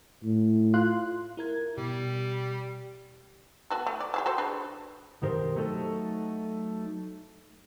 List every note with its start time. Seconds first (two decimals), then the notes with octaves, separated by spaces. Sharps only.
0.23 A2
0.74 F4 C6 F#6
1.37 E4 A#4 G#6
1.78 B2 G3
3.70 B3 F#4 A4
3.86 A3
4.00 D5
4.14 G4 F5 A5
4.26 F#4 A4 C5
4.38 D4 G#4 B4
5.22 B1 F#2 D#3 G4 A#4 C5
5.56 F#3 A3 D#4 A4